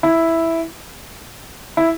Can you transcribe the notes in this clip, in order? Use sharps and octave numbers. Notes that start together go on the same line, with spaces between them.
E4
E4